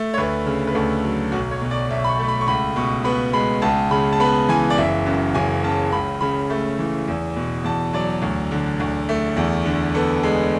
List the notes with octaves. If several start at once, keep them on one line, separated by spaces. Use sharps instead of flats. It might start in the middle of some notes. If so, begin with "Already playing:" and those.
Already playing: A3
C#5
D2 B4
C#3
B4
D2 A4
F#3
B1 F#4
C#5
B2
D5
B1 E5
B5
C#6
A3
B5
C#6
C#2 B5
B2 C#6
B3 B5
G#3 B5
C#2 A5
C#3 B5
A5
B3 B5
E3 G#5
D5
F#1 E5
F#2
F#1 G#5
C#3 A5
C#2 B5
C#3 B5
A3
E3
E2
B2
E2 A5
F#3 D5
D2
D3
D2
A3
E2
D3
B3 A4
G#3